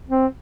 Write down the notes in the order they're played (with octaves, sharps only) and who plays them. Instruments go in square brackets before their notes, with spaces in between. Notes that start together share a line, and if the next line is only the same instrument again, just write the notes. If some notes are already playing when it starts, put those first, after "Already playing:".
[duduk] C4